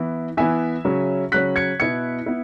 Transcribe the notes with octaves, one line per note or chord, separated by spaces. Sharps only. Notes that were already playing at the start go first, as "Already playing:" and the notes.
Already playing: E3 B3 E4
E3 B3 E4 E5 G#5
C#3 F#3 C#4
C#3 F#3 C#4 F#6 B6
G#6 C#7
B2 B3 E4 G#6 C#7
B3 E4